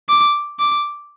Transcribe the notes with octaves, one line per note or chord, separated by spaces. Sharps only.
D6
D6